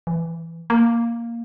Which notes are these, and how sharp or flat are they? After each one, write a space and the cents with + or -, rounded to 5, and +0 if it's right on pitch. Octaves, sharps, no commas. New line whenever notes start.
E3 +10
A#3 +0